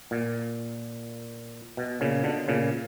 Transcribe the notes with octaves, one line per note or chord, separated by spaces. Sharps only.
A#2
B2
A#2 C#3
B2 D3
A#2 C#3